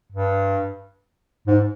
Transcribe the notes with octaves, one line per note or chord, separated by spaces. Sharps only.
G2
G#2